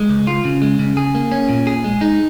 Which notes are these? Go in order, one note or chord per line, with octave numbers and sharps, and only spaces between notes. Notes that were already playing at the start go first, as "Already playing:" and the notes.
Already playing: G#3
C#2
F4
C#3
G#3
C#3
G#4
A#3
C#4
A#2
G#4
G#3
D#4